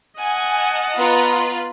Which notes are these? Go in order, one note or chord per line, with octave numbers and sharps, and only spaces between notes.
D#5 F#5 G#5 A5
B3 F4 B4 A#5